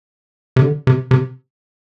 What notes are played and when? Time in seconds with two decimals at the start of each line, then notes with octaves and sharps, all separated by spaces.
0.56 C3
0.62 D3
0.87 C3
1.11 C3